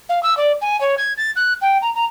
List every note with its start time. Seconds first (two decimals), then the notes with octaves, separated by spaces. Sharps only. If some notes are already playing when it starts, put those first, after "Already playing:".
0.09 F5
0.23 E6
0.37 D5
0.61 G#5
0.81 C#5
0.98 G#6
1.17 A6
1.36 F#6
1.61 G5
1.82 A#5
1.95 A#5